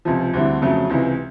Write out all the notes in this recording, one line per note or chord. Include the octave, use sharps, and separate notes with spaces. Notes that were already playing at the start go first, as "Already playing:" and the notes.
C#2 C3 F3
D2 D3 G3 C4 E4
F2 C#3 F#3 A3
C#2 C3 E3